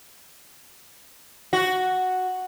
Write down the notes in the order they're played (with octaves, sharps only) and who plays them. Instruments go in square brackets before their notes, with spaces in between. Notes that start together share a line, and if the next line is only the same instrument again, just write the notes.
[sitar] F#4